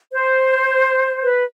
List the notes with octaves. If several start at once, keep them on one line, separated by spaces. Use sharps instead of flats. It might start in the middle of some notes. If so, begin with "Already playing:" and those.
C5
B4